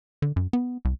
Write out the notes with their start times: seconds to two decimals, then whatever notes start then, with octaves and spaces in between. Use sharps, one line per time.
0.22 D3
0.36 F#2
0.53 B3
0.85 C2